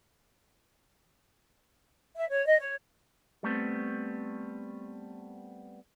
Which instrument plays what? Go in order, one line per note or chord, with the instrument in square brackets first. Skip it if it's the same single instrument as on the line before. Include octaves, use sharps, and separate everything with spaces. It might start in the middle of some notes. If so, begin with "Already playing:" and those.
[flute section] E5
C#5
D#5
C#5
[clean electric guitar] G3 A3 B3 C4